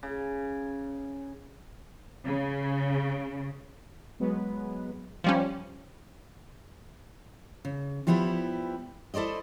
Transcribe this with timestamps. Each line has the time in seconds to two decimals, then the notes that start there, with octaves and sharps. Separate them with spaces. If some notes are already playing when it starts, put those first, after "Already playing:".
0.03 C#3
2.27 C#3
4.20 F#3 G#3 B3 B4
5.24 F3 G3 C#4
7.65 C#3
8.07 F3 G3 B3 E4 F4 G4
9.14 E4 A4 C5 D5 D#5